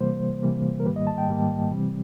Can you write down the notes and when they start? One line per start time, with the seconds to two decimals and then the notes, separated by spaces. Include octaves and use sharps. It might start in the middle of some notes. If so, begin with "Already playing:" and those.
0.01 C3 E3 G3 A#3 C5
0.43 C3 E3 G3 A#3
0.80 A#4
0.86 G#2 D#3 G3 A#3 B4
0.96 D#5
1.07 A5
1.18 G5
1.28 G#2 D#3 G3 A#3
1.71 C3 E3 G3 C4